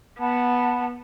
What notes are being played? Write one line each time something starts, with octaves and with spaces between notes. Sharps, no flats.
B3 F#5 A5 B5